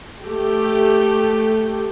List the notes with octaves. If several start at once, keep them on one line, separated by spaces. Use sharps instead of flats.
A3 G4